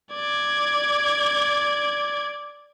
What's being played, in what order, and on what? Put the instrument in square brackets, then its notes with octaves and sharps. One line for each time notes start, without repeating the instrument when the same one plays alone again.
[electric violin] D5 G#6